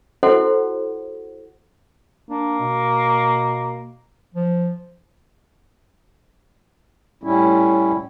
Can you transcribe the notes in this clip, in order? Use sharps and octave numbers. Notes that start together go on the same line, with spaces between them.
E4 F#4 A4 C5 F#5
A#3 D4
B2
F3
A2 G3 C#4 E4